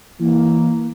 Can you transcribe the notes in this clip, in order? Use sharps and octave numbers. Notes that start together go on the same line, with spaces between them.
E3 A#3